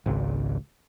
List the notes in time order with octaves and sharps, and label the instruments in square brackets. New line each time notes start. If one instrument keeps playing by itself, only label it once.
[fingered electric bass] G#1 C#2